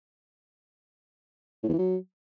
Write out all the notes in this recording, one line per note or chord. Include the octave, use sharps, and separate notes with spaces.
A2
E2
E3
F#3